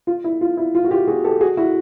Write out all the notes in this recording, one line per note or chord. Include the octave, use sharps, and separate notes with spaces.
F4
E4
F4
E4
F4
F#4
F4 G4
F#4 G#4
G4 A4
F#4 G#4
E4 F#4